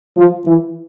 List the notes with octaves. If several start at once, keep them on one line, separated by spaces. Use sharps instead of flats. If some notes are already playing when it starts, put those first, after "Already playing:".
F3
E3